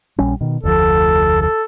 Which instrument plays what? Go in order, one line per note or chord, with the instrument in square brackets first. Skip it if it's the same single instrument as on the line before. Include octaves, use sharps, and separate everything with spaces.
[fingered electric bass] A#1 G3 C#4
B2 D#3
[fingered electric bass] F1 D2 F3 [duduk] A4
[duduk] A4